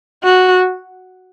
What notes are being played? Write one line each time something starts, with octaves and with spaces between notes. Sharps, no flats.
F#4